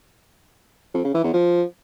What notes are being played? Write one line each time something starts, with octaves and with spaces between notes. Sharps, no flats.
F2
C#3
E3
E2
F3